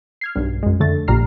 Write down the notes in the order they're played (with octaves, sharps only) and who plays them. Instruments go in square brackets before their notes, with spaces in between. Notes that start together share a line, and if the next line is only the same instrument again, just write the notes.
[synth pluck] F6 G#6 C7
B1 G2
F#2 G#3
F2 D3 A3 A6
A#1 A#2 G3 A#5 F6 C7